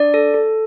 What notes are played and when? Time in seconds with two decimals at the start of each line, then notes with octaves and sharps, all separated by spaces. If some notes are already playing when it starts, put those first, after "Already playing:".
Already playing: D4 D5
0.14 A4
0.34 A4